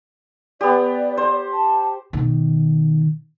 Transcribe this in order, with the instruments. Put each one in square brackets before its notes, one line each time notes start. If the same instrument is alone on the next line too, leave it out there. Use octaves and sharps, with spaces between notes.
[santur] B3 G4 [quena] D5
[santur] C5
[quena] A5
[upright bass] B2 D#3